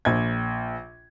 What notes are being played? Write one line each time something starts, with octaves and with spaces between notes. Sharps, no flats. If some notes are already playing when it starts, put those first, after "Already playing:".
A#1 G#6